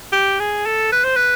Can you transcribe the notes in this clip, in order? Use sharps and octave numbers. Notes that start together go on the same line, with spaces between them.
G4
G#4
A4
B4
C5
B4